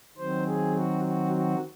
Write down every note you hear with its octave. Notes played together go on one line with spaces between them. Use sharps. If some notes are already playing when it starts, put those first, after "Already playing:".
D#3 F#3 C4 C5
G#4
F#4
F#4
F#4